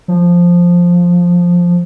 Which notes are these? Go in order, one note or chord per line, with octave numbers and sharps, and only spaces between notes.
F3